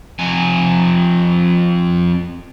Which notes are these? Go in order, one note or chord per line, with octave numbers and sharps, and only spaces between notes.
F2 G#5